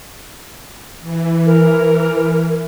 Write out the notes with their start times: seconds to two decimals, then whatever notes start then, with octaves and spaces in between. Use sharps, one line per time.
1.02 E3
1.46 A#4